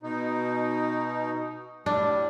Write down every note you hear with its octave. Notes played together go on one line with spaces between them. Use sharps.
B2 D#4
A2 G3 D4